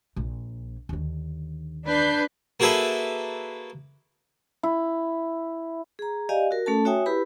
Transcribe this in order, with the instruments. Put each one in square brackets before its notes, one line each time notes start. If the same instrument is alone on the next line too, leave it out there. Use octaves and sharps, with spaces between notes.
[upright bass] A#1
D#2 D3
[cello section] D4 [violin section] B4 G6 C7
[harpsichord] A#3 F#4 G#4 A4 B4 E5
[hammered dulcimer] E4
[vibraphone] G#4 A#5
G4 D5 D#5 F5 G#5
F#4 A#4
A3 C#4 A4 A5
F#4 C#5 E5 G5 G#5 D#6
E4 G4 B4 B5